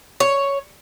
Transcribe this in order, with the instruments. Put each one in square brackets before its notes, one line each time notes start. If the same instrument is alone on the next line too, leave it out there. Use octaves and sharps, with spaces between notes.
[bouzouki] C#5